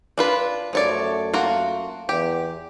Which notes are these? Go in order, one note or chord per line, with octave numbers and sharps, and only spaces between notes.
D4 F4 B4
F#2 F3 A3 C#5 D5
A#3 F4 F#4
E2 G4